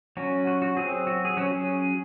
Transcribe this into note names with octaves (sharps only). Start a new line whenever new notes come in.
F#3 C#4 F#4
F#4
F#4
F#3 C4 G#4
F#4
G#4
F#3 C#4 F#4
G#4